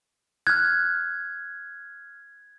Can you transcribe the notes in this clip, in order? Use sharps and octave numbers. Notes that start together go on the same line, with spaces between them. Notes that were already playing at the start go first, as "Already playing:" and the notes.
F6 F#6 G#6